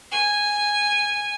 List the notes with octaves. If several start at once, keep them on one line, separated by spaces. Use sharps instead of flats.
G#5